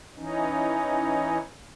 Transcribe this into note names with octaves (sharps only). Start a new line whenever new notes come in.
E3 C#4 D#4